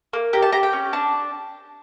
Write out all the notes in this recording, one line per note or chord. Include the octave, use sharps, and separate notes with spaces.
A#3
G4 A#5
A5
G4 A#5
G5
C#4
D4 A5